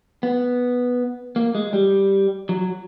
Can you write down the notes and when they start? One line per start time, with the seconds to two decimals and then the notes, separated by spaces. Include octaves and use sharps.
0.23 B3
1.36 A#3
1.55 G#3
1.73 G3
2.49 F#3